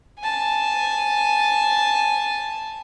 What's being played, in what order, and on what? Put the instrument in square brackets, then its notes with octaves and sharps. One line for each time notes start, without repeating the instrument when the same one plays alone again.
[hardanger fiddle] G#5 A5